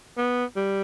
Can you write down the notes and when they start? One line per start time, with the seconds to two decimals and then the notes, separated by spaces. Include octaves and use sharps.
0.18 B3
0.56 G3